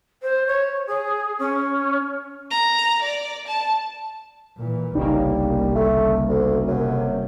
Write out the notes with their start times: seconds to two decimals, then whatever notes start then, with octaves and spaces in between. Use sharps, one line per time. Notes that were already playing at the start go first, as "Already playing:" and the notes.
0.22 C5
0.47 C#5
0.87 G#4
1.39 C#4
2.50 A#5
3.02 D5
3.47 A5
4.57 A#2 E3
4.95 G1 C2 C#3 G3 A#3 D#4
5.75 A3
6.28 D2
6.68 F#2 C3